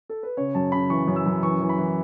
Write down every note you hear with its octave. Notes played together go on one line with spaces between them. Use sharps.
A4
B4
C#3 C#5
F#2 A5
C#3 B5
E3 C#6
F#2
E6
F#2
E3 C#6
E3
B5
E3